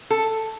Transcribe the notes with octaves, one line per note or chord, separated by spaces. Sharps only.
A4